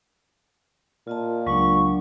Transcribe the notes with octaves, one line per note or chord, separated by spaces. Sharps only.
A#2 F4 D#5 A5
C#2 F#3 D4 C#6